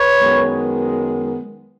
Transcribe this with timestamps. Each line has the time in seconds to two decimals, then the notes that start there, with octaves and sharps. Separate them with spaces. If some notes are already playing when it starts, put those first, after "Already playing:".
Already playing: B4 C#5
0.19 F#2 D#3 G#3 B3